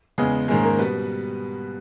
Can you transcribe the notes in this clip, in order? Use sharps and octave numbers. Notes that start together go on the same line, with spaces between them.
E2 C#3 G#3 B3 G#4
G#2 D#3 G#3 A#3 C#4 G#4
A#3 A#4
B2 G3 B3 B4